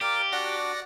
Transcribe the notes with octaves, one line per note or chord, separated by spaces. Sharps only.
G4 A#4 D5 F5 D6
D4 F#4 D5 F#5 A#6